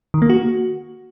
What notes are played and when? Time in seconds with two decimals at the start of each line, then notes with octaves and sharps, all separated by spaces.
0.14 D#3
0.22 A#3
0.30 F#4